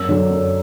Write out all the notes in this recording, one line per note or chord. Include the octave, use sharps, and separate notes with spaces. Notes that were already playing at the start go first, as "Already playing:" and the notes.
Already playing: F#2 E6
D3 F#3
F#2